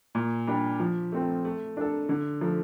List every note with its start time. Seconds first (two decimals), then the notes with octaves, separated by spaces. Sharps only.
0.15 A#2
0.47 G3 D4
0.80 F3
1.12 A3 C4
1.45 A3
1.77 D4 A4
2.09 D3
2.41 F3 A3